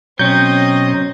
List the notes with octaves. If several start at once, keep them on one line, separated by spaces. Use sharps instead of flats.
B2 F#3 C4 C#4 C#5 D#5 A#5 G6